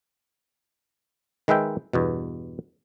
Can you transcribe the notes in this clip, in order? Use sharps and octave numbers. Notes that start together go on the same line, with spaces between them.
D#3 G#3 B4 E5 G5
E2 G2 B2